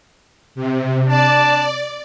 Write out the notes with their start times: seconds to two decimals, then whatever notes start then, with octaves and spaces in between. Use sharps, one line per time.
0.55 C3
1.07 D4 D5 A5